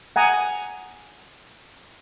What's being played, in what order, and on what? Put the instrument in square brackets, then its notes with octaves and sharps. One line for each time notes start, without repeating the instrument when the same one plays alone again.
[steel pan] F#5 G#5 A#5 D#6